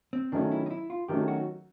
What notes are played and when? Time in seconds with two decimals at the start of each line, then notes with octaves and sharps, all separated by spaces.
0.13 C4
0.32 D#3 F#3 A3 C#4 D4
0.52 E4
0.66 D#4
0.71 E4
0.90 F4
1.08 D#3 F#3 A3 C#4 G4
1.28 F#4